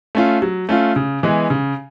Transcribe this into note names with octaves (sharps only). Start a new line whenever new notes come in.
A3 C#4 F4
F#3
A3 C#4 F4
C#3
E3 G#3 B3
C#3